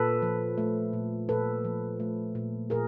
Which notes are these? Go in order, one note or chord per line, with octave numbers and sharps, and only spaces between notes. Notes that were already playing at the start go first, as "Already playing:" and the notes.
Already playing: A#2 A4 B4
F3
A3
A#2
A#2 A4 B4
F3
A3
A#2
A#2 G#4 A#4